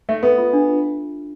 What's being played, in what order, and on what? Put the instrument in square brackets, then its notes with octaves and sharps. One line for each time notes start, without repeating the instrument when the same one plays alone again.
[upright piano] A3 [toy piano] E5
[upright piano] B3 [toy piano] A4
[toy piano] F4
D4
F4